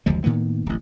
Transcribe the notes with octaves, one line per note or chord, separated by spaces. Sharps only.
F#1 D2 F3 G#3
A2 D#3 A#3 B3
D1 A1